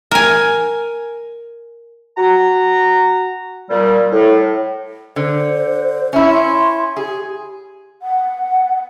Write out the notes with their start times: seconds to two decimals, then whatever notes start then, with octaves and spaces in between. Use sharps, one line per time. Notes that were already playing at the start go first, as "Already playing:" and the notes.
0.11 A#4 G#5
2.17 F#4 A#5
3.70 A#2 G3
4.12 A2
5.16 D3 C5
6.13 C#4 E4 E5
6.30 C6
6.97 G4 G#4
8.02 F#5